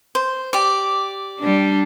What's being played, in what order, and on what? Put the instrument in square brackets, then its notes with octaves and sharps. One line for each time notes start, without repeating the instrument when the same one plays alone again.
[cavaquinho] C5
G4 D5
[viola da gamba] G3 D4